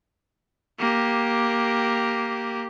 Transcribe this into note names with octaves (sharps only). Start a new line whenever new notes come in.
A#3 G4